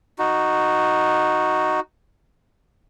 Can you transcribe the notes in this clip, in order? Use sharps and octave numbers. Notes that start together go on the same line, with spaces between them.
D#4 F#4